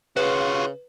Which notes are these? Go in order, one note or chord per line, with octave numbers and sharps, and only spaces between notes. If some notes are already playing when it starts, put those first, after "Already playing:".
C#3 F4 F#4 B4